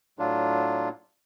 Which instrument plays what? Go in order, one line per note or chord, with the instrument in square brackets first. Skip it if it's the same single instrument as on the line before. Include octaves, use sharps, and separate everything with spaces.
[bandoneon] A2 F#3 D4 F4